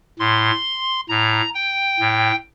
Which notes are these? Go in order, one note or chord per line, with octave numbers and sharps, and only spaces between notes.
A2 C6
A2 A#5
G5
A2